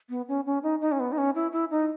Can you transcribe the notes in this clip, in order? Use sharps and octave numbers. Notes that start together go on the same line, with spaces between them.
B3
C#4
C#4
D#4
D#4
C#4
B3
D#4
C#4
E4
E4
D#4